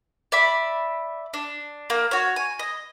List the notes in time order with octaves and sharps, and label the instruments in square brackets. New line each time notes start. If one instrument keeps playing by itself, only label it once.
[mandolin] D5 E5 B5
D4
A#3
F#4 C#5
G#5
D#5